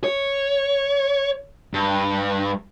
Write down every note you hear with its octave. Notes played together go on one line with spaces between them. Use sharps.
C#5
G2